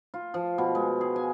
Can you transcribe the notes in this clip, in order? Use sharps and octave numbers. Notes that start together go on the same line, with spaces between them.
F4
F3
B2
G#3
G#4
G#5